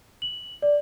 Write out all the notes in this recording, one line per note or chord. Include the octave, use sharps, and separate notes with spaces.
F#7
D5